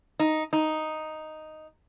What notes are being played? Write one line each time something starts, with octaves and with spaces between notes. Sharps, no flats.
D#4
D#4